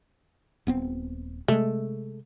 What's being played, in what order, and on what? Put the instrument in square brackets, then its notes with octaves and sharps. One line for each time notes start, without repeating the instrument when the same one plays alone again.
[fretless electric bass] D#1 B3 C4
[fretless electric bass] C3 G#3 [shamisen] A3